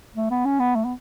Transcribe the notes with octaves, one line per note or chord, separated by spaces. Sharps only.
A3
B3
C#4
B3
A3
B3